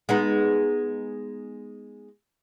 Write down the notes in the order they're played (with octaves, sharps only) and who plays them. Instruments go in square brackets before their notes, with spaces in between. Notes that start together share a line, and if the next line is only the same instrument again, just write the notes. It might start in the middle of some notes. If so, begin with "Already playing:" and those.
[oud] G#3 B3 D#4